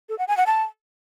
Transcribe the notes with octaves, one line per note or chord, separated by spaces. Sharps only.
A4
F#5
G#5
F#5
A5